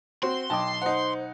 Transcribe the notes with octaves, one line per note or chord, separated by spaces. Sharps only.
C4 F#4 C6
B1 D#5 G5 A5 D6
D#4 C5 F#5